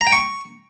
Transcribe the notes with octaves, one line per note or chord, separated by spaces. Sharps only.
A#5
G5
C#6